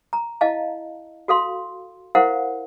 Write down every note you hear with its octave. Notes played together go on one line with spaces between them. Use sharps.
A#5
E4 D#5 F5 A5
F#4 A4 F5 C6
E4 A#4 C5 F5 F#5